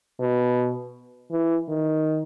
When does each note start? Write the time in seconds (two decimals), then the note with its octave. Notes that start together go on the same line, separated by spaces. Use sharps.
0.20 B2
1.31 E3
1.68 D#3